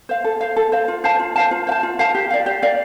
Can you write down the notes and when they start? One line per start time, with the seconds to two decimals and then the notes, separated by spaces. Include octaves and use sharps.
0.09 C5 F5
0.24 A4
0.41 C5 F5
0.56 A4
0.72 C5 F5
0.88 F4
1.04 C5 F5 A5
1.19 F4
1.36 C5 F5 A5
1.51 F4
1.67 C5 F5
1.71 A5
1.83 F4
1.99 C5 F5 A5
2.15 G4
2.30 D5 F5
2.46 G4
2.62 D5 F5